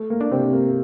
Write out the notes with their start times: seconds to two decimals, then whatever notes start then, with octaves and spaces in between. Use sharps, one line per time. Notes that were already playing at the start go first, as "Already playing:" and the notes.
Already playing: A3
0.10 A#3
0.21 D4
0.31 C3 C4
0.53 A#3 C4